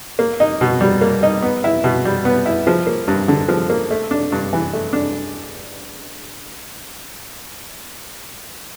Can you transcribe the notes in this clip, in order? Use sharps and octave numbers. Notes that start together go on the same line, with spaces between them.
A#3
D#4
B2
G3
A#3
D#4
B3
E4
B2
G3
B3
E4
F3
A#3
G2
D3
F3
A#3
A3
D4
G2
E3
A3
D4